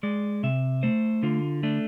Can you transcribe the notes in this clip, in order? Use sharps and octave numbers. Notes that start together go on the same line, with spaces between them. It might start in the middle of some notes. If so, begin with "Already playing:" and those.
G#3 D5
C3 E5
A3 C5
D3 F4
A3 D4